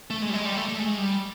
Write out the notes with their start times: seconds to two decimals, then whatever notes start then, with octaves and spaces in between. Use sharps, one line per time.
0.10 A3
0.22 G#3
0.29 G3
0.34 G#3
0.45 G3
0.56 A3
0.69 A3
0.79 G#3
0.98 G3